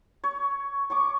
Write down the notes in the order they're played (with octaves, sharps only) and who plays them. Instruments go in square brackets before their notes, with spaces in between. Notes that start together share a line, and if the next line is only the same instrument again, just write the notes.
[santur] C#5
C#5 C#6 D6